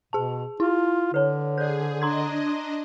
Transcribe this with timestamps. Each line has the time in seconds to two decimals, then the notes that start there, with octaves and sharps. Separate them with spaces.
0.13 B2 G#4 A5
0.60 E4 F4
1.14 D3 B4 C#5
1.58 G#4 C5 D5 G6
2.02 D4 D#5 A#5 C6 G#6